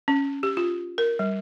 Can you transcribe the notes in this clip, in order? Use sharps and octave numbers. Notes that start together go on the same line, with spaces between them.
C#4
G4
F4
A#4
G3